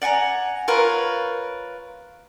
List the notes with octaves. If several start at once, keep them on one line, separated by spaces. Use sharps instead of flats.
D5 F#5 G#5 A#5
F4 A#4 B4 C#5